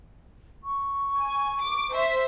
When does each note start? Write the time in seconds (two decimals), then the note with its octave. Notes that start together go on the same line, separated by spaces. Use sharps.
0.64 C#6
1.18 G#5
1.61 D6
1.92 C5 E5 B6